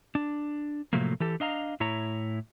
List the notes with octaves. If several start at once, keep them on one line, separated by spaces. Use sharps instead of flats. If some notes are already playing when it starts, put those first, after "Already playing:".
D4
A2 C3 F3 F#3 A3 A#3
E3 G4 A4
D4 D#5 F5 A#5
A2 E4 C#5 A#5